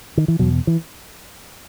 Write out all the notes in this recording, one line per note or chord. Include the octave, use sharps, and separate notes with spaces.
D#3
E3
E2 B2 F#3
E3